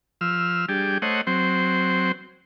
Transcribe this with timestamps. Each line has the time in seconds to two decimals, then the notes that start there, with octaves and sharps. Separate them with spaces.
0.21 F3 E6 F6
0.69 G3 D4 G4 G#4
1.02 A3 C5 C#5 D#5 F#5
1.27 F#3 C4 C5